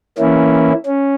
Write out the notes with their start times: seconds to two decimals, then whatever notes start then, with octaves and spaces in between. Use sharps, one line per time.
0.19 E3 A#3 C#4 E4
0.86 C#4